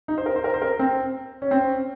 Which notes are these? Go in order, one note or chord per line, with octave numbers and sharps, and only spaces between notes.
D#4
C5
A#4
C5
A#4
C5
A#4
C4
C#4
C4